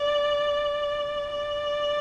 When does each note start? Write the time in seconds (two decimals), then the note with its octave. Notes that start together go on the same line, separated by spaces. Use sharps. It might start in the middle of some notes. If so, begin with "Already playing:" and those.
Already playing: D5
1.32 D5